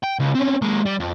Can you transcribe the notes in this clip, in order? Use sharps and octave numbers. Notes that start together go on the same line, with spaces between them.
G5
C#2
C4 C#4
G#3 A#3
G3
F2